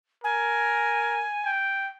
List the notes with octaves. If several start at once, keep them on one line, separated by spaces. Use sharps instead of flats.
A#4 G#5
G5